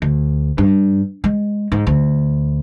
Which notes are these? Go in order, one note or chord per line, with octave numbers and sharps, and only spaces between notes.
D2
G2
G#3
G#2
D2